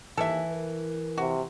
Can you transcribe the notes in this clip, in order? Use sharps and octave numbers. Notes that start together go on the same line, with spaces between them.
D#2 E3 A4 E5
A#4
C3 F#4